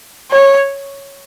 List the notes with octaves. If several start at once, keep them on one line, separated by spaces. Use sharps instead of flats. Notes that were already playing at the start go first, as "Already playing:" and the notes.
C#5